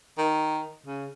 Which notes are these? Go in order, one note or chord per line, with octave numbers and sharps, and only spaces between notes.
D#3
C#3